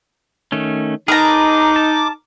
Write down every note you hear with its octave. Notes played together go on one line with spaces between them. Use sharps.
D#3 A3 C#4
D#4 G#4 A#4 B4 A5 A#5 D6
A5